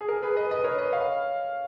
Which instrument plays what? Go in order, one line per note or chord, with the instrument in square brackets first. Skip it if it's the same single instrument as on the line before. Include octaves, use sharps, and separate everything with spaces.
[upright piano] G#4
A#4
G#4 B4
B4 D#5
B4 D#5
A#4 C#5
B4 D#5
C#5 F5